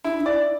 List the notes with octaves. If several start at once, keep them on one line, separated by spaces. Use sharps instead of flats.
D4 E4
E4
D5